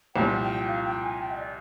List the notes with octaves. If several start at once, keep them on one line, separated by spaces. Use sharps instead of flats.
C2 A#2 F3 G5
G5
F5
G5
G#5
G5
D#5
D5